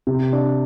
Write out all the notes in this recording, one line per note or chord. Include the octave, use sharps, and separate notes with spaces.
C3
D4